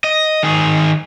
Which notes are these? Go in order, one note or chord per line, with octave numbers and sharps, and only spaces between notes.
D#5
D#3 G#4